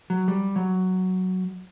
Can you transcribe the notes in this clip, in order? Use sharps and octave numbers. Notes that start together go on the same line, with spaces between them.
F#3
G3
F#3